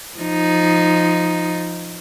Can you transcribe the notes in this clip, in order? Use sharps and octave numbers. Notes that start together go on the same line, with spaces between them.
F3 D#4